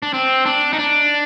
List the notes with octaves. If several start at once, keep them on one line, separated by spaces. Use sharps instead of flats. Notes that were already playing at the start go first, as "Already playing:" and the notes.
D4
C4
D4
D#4
D4